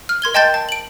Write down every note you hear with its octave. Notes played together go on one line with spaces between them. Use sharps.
F6
A#4 C6 G#6 G7
D#5 G5 A5 C6 G6 A6
A5
D7 F#7